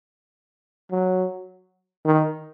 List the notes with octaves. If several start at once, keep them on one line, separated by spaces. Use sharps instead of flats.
F#3
D#3